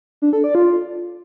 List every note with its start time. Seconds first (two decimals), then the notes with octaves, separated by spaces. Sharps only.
0.22 D4
0.33 A4
0.44 D5
0.55 F4